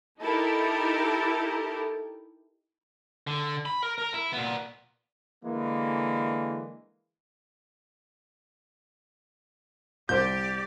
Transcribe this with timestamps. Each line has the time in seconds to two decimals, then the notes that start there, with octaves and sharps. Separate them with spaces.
0.20 D#4 E4 G4 A4 A#4
3.27 D3
3.66 B5
3.83 A#4
3.98 A#4 A#5
4.14 E4
4.33 A#2 B3
5.44 D3 E3 G#3 A#3
10.09 C2 G4 C5 D5 G6